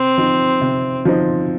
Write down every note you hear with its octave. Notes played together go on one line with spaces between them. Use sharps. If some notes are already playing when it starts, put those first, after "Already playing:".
Already playing: C3 C4
F3 D#4 C5
C3
F3 D#4 C5